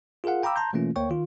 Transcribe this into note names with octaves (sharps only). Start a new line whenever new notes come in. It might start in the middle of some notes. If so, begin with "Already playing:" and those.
F4 G#4 A#4 F5 F#5
F5 G5 A#5 B5 D6 E6
A5 A#5 C6 G6
B2 E3 A3 A#3 C#4 F4
D2 A#3 C#5 G5 C#6
D#3 F4